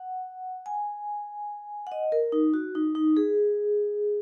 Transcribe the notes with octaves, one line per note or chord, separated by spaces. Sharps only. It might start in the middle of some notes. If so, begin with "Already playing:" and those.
Already playing: F#5
G#5
F#5
D#5
A#4
D#4
F#4
D#4
D#4
G#4